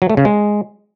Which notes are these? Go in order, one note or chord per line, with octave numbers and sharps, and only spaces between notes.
F#3
A3
C#3
G#3